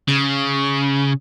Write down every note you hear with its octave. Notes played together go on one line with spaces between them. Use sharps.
C#3